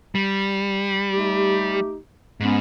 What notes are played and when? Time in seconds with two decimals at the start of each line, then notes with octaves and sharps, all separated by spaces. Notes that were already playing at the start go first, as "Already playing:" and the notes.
0.15 G3
1.12 A3 D#4 G4
2.40 G#2 B3 C#4